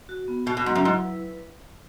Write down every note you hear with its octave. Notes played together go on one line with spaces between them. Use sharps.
F#4
B3
B2 F#4
B2
G#2 F#3
F#2
G#2 E4
B4